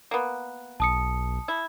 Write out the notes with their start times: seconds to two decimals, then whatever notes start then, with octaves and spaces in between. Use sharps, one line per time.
0.11 A#3 B3
0.80 B1 A5 D#6 C#7
1.48 E4